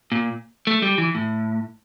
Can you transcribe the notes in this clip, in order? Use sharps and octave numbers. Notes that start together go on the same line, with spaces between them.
A#2
A3
G3
E3
A2